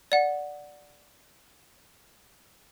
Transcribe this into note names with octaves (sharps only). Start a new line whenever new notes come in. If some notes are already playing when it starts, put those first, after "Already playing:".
D5 F#5